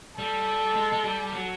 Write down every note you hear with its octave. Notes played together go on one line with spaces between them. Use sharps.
G3 A4
G#3
G#3
G3
F#3